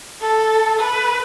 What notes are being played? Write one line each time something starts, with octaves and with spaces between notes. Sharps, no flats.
A4
B4